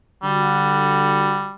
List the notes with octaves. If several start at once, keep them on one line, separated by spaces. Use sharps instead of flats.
D3 G3 F#4